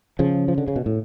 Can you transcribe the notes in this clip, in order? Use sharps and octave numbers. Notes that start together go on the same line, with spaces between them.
C#3 F3
F3
D3
C#3
B2
A2